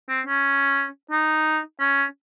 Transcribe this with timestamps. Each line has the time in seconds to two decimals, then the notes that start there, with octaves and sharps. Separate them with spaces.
0.09 C4
0.26 C#4
1.11 D#4
1.80 C#4